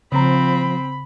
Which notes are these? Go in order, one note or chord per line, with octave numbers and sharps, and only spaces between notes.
C#3 F3 C4 A#5 B5